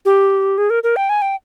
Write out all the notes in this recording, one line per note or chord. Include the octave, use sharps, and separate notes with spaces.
G4
G#4
A#4
A#4
G5
G#5
G5